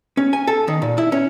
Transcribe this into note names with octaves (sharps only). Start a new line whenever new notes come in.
C#4
G#5
A4
D#3
A#2
E4
C#4